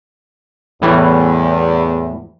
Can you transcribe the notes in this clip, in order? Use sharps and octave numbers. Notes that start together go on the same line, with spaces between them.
E2 A2 E3 G3